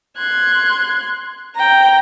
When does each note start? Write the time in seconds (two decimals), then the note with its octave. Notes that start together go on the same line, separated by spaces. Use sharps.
0.17 C6 F#6 G#6
1.56 G5 A#5